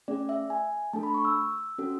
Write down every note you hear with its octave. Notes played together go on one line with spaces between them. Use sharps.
A3 C#4 G#4 D5
E5
G#5
A3 D4 A4 A5
B5
C#6
E6
C#4 F#4 A4